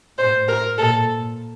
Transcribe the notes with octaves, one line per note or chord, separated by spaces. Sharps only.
A2 C5
A#4
A#2 A4